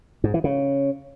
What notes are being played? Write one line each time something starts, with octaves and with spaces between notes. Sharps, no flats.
G#2
E3
C#3